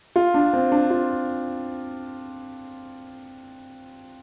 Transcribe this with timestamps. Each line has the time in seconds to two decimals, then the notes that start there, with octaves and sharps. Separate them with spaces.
0.16 F4
0.34 D4
0.53 C4
0.72 D4
0.90 F4